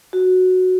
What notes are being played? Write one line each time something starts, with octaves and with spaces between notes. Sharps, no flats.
F#4